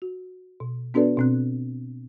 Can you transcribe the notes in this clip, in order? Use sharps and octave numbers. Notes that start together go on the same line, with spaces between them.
F#4
B2
B3 D4 F#4 A4 B4 D5
B2 C4 F#6